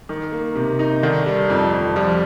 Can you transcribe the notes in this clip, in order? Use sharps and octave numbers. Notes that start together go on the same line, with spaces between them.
D#3
A#3
C3
D#4
D3 D#3
G3
F2
F2
F3 G3